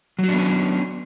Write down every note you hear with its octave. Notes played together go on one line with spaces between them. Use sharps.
F#3 B3 C#4 D4 F#4